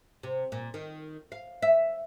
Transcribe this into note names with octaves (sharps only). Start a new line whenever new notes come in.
C3
A#2
D#3
F5
E5